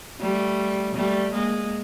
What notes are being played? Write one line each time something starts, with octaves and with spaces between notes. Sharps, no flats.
G3 A3
G3 A3
G#3 A#3